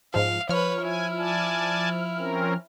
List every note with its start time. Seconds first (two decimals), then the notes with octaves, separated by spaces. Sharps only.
0.14 G#2 F3 F5
0.49 F3 B4 C#5 F6
0.82 E4 G#5
1.17 D5 G#5 A5
2.18 C4 C#4 A#4